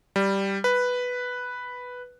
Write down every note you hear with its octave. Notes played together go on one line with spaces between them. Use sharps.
G3
B4